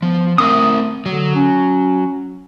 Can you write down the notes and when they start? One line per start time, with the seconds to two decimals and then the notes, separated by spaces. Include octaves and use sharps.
0.02 F3 B3
0.38 A3 C4 A#4 D#6
1.06 D3 F#3
1.35 C#4